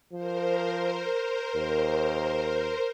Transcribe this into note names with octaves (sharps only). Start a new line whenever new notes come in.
F3 A#4 C5
D#2